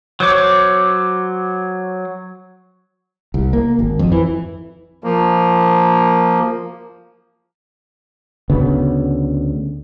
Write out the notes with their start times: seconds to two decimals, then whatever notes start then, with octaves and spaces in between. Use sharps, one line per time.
0.20 F#3 C5 C#5 D6
3.34 C2
3.53 A#3
3.79 G#1
3.99 F2
4.12 E3
5.04 F3 A#3
8.50 D2 C#3 B3